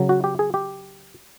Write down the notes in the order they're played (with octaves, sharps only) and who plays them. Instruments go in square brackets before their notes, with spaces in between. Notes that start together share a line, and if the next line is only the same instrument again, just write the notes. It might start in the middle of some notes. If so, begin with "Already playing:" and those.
Already playing: [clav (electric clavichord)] C#3 F#3
F#4
G4
G#4
G4